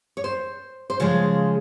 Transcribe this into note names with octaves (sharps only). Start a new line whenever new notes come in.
C#5
C5
C5
C#3 F3 G#3 C#5